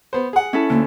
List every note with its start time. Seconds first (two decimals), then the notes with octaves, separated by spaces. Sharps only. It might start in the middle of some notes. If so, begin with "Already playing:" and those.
0.13 B3 C5
0.33 G#4 F#5
0.53 C#4 E4 A4
0.70 D2 A#3